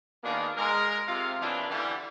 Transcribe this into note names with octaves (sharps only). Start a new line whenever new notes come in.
B2 D#3 A#3 D4 F4 G#4
G#3 A#4
C3 F4 F5
F#2 B2 E3 D4 E4 F4
D3 E3 G3